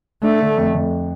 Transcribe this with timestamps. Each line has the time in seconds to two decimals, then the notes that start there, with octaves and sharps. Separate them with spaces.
0.23 A3 D4
0.40 D3
0.58 F2
0.74 F2